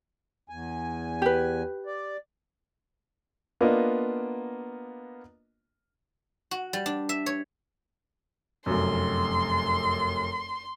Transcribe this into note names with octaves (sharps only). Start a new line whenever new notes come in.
E2 G#5
G4 B4
D5
A#3 B3 D4 F4 A#4 D#5
F#4
G3
D4
E5
C#5
F1 F#2 C6